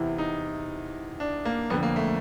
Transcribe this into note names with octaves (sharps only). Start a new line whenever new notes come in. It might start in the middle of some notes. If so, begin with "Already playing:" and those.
Already playing: E2 C3 E3 E4
D#4
D4
A#3
F2 D3 B3
A#3
A3